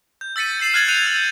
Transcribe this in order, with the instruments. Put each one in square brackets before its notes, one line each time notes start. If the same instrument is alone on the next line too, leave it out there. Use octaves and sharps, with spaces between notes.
[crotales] G6
E6 A6 B6 C#7 D#7
E6 A6 C7 E7 F#7
F6 F#6 G#6 A6 F#7
F#6 G6 C#7 D#7 F7
E6